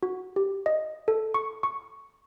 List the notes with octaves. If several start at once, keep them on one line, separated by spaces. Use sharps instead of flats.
F#4
G4
D#5
A4
C#6
C#6